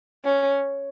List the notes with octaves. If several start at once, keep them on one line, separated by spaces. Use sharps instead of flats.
C#4